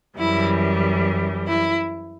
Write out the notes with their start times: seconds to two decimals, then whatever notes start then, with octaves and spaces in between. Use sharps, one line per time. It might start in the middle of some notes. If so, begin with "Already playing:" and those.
0.18 F#2 E3 G3 E4
1.47 E4